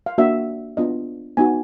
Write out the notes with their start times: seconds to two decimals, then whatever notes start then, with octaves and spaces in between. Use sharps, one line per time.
0.06 F5
0.18 A#3 D4 F#4 E5
0.77 B3 D4 F4 D#5
1.37 B3 D#4 F#4 G#5